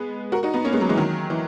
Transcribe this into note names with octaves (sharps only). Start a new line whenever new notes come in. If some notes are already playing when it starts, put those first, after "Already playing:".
Already playing: G#3 B3
F#4 A#4
D#4 F#4
B3 D#4
A#3 C#4
G#3 B3
F#3 A#3
E3 G#3
D#3 F#3
E3